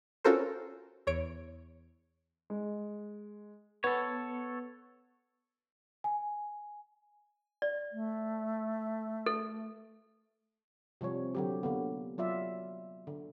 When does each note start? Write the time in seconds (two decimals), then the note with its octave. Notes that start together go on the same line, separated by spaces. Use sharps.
0.24 C#4 F4 F#4 A4 A#4 C5
1.07 E2 C#5 D7
2.50 G#3
3.84 B3 A4 B4 C#5
6.04 G#5
7.62 D5
7.92 A3
9.26 A4
11.01 C3 F3 G3 C#5
11.35 D3 F#3 G4
11.63 D3 A#3 B3
12.18 F#3 F4 D5 E5
13.07 D3